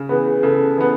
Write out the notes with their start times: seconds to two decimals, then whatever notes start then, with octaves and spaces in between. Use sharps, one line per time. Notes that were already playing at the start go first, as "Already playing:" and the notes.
Already playing: C#3
0.09 E3 B3 G#4
0.26 G#4
0.43 C#3 A4
0.77 E3 B3